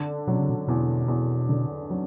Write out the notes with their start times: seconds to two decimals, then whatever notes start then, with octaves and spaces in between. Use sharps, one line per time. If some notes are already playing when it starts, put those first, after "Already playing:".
Already playing: D3
0.27 B2 F#3
0.38 C#3
0.49 B2
0.68 E2 B2
1.08 E2
1.49 D3
1.90 F#3